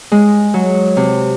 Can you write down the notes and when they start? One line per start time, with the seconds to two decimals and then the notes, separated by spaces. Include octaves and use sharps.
0.12 G#3
0.54 F#3
0.97 C3